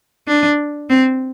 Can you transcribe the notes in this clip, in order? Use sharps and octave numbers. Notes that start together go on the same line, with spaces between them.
D4
C4